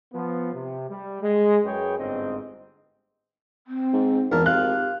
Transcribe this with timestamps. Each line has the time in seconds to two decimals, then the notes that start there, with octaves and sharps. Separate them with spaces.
0.13 F3 B3
0.53 C3
0.89 G3
1.22 G#3
1.64 F#2 G#4 B4 C#5 G5
1.98 G1 G#2 C4 D#5
3.67 C4
3.93 G#2
4.32 G#1 E2 A#4 A5
4.46 F4 G4 F#6